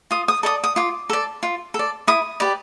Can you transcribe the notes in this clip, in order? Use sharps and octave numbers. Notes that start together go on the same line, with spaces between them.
F4 D#6
D#6
A4 D5 D#6
D#6
F4 D6
A4 D5
F4
A4
D5
E4 D#6
G4 B4 D5